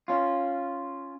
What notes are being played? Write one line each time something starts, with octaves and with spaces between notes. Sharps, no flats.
C#4 F4